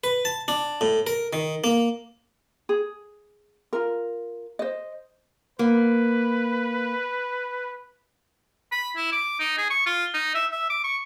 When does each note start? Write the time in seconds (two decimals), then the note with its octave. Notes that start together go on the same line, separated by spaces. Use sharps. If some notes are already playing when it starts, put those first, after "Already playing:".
0.04 B4
0.25 A5
0.48 D4
0.81 A2
1.07 A#4
1.33 D#3
1.64 A#3
2.69 G#4
3.73 F4 A#4
4.59 C5 D#5
5.59 A#3 B4
8.72 B5
8.96 E4
9.12 D6
9.40 D#4
9.58 G#4
9.70 C#6
9.86 F4
10.14 D#4
10.35 E5
10.52 E5
10.70 D6
10.84 C#6